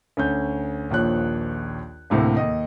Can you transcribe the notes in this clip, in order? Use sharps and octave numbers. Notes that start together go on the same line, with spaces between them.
D2 C#4 G6
A#1 D#2 F3 C#5 F#6
D2 A2 C3 A#3
D#2 D#5